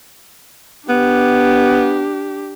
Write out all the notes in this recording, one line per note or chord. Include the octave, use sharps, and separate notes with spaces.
B3 D4 G4